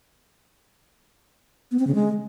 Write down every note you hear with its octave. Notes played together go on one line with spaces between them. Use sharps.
B3
C4
C#3
G#3